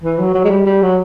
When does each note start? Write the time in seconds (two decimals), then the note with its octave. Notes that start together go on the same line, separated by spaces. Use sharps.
0.04 E3
0.19 F#3
0.35 F#3
0.44 G#3
0.50 G3
0.66 G3
0.82 F#3